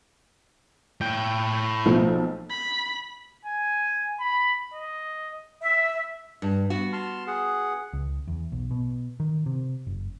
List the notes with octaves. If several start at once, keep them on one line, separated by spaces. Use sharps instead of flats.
A2 G5
B1 F3 A3
B5
G#5
B5
D#5
E5
G2
B3 F#4
A5 C6 F6
G#4 F#5
C#2
E2
B1
B2
D#3
C3
F#1